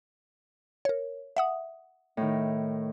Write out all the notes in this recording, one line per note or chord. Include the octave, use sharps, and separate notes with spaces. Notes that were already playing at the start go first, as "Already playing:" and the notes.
A#4 C#5
E5 F#5 D#6
A2 D#3